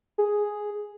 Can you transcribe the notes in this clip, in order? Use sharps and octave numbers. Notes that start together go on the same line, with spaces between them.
G#4